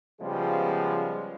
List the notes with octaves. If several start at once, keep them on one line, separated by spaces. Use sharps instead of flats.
C#3 F3 G3 G#3 B3